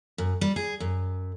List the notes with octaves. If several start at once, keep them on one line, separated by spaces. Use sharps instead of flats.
F#2
G3
G#4
F#2